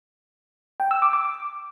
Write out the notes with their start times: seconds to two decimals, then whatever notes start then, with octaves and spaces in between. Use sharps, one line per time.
0.80 G5
0.91 E6
1.02 D6
1.13 D6